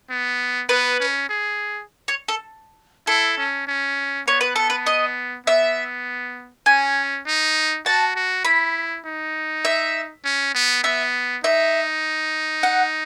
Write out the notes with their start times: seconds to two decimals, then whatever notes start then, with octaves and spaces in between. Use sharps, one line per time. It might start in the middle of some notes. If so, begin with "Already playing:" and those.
0.10 B3
0.69 B3 B4
1.00 C#4
1.29 G#4
2.08 C#5
2.28 A4
3.07 E4 A4
3.38 C#4
3.67 C#4
4.27 B3 C#5
4.41 B4
4.56 B3 A4
4.70 B4
4.86 D#5
5.46 B3 E5
6.66 C#4 G#5
7.26 D#4
7.86 F#4 A5
8.16 F#4
8.45 E4 B5
9.05 D#4
9.65 E5
10.24 C#4
10.54 B3
10.83 B3 E5
11.44 D#4 E5
12.63 F#5